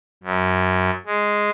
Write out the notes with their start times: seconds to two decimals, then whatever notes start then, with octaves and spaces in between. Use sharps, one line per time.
0.24 F#2
1.06 G#3